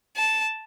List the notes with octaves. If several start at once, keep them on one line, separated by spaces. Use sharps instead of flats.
A5